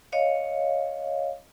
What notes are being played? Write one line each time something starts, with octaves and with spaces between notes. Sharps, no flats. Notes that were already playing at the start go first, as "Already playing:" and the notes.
C#5 D#5 F5